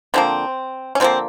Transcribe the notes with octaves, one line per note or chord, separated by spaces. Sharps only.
D3 F3 A#3 C4
C#4
D3 F3 A#3 C4